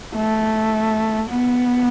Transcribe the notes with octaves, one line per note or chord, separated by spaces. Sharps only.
A3
B3